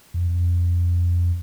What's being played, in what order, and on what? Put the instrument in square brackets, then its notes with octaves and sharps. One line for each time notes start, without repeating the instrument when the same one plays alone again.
[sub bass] F2